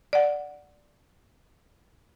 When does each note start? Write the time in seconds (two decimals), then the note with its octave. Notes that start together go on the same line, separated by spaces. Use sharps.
0.13 D5 F#5